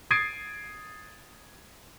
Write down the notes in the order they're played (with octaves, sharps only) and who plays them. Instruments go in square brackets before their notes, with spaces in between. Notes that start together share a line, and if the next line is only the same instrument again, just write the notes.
[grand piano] D#6 G#6 A6 C7 D7 D#7